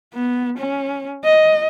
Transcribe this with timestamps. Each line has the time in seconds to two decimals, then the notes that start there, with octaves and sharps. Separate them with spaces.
0.14 B3
0.58 C#4
1.24 D#5